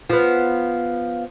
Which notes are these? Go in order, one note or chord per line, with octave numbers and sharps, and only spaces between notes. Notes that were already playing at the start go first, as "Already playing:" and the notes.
F3 B3